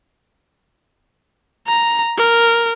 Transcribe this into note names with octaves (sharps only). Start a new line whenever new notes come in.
A#5
A#4